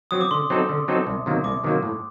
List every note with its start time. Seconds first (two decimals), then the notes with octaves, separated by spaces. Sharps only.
0.11 F#3 C4 D#6
0.21 D6
0.31 D3 C6
0.50 F#3 C4 D#4 A4
0.69 D3
0.88 F#3 C4 D#4 A4
1.07 C2
1.26 C3 D#3 F#3 A#3
1.44 C2 D6
1.64 C3 D#3 F#3 A#3
1.83 A2